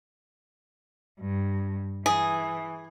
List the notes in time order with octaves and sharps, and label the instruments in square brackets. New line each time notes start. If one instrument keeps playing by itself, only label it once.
[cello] G2
[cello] E3 [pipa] G#4